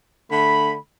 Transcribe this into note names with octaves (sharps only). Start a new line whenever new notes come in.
D3 A3 B5